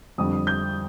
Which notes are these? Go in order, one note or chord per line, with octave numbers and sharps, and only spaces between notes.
F2 D3 G3 D#6
G6